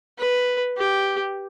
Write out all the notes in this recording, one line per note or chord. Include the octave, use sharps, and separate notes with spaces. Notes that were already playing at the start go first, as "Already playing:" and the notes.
B4
G4